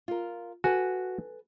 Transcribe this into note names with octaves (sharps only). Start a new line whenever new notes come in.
F4 A#4
F#4 A4 B4 G#5